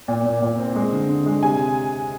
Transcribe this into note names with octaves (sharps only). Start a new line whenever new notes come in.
A#2
A#2
A#2
C4
G#3
D3
D3
G#3
C3 G#5